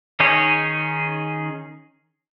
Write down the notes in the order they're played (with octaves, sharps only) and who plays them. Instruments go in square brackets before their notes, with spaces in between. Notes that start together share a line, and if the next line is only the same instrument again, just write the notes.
[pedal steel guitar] D#3 C#4 D#4 G#4 C#5